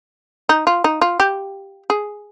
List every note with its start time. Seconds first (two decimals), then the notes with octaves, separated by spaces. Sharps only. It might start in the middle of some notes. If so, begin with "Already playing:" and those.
0.49 D#4
0.67 F4
0.84 D#4
1.01 F4
1.20 G4
1.90 G#4